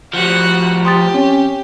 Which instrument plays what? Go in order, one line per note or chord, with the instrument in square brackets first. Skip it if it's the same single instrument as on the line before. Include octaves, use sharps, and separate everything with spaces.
[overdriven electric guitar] F3 G3 [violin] F#4 F#5
[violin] G4 [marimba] C6 D#6 A6
[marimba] C4 [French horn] C#4